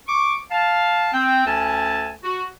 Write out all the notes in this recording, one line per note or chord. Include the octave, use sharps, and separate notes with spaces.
C#6 D6
F5 A5
C4 G5
D2 C#4 A4 G#5 A5
F#4